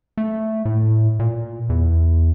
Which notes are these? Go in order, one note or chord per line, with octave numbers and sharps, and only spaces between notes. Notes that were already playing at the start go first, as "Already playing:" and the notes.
A3
A2
A#2
E2